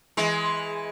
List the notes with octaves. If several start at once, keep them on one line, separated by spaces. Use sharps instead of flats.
E3 G#3